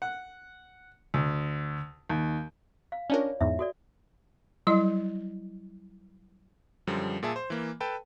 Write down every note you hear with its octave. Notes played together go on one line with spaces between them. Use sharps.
F#5
D2
D#2
F5
C#4 D4 F4 A#4 C#5 D5
E2 G#2 E5
F#4 A4 D5
F#3 G3 E4 D#5
F#2 D3 F3 G3
A#2 G#4 E5 A5
C5
E3 A#3
A4 B4 G5 A5